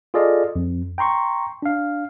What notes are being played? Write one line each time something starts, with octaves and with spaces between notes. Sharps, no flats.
F4 G#4 A4 D5 D#5 F5
F2
G5 A#5 C6 C#6
D4 F5